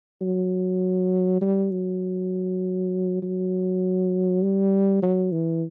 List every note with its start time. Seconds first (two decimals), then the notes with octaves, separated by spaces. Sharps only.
0.21 F#3
1.41 G3
1.71 F#3
3.22 F#3
4.43 G3
5.02 F#3
5.32 E3